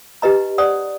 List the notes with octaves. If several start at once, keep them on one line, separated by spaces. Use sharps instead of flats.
D#4 G4 B4 D#5 A#5
C5 D5 F#5 D#6